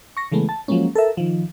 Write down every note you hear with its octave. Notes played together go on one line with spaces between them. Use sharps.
C#6 A#6
C#3 E3 G#3 A3 B3
A5
F3 F#3 G#3 A#3 C#4
A4 A#4 E5
D#3 F3